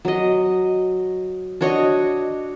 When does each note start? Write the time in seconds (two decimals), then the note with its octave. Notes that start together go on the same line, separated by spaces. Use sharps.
0.05 F#3 D#5
1.61 D4 F#4 C#5 D#5